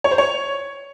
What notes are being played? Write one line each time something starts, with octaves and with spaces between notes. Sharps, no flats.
C#5
C5
C#5